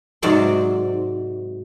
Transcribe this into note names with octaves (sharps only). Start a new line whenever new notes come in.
G#2 C3 F#3 D5 C6